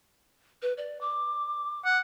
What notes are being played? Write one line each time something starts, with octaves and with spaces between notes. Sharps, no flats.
B4
D5
D6
F#5